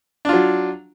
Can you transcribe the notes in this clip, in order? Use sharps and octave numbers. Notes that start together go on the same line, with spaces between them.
F#3 D4 F4